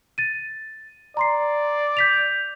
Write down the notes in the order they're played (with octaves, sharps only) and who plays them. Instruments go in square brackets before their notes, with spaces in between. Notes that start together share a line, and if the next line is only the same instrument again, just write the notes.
[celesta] A6 D#7
[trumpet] D5 [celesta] A#5 C6 C7
[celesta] G6 B6 F7